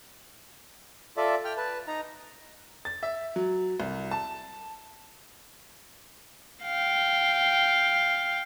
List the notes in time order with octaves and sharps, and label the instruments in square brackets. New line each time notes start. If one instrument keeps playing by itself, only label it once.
[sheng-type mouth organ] F4 A4 D5 E5
G5 F6
B4 A5
D#4 A#5
[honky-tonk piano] A6
E5
F#3
C2
A5
[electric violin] F5 G5